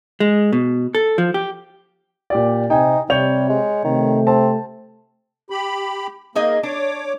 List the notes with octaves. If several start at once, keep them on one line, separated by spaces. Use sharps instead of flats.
G#3
B2
A4
F3
G4
A#2 G4 D5
C3 D#4 G5 G#5
C3 G3 C#5 G6 F7
G#3
C3 D#3 A3
C4 A5
G4 B5
A#3 D#4 G#4 D#5
D4 C#5 D6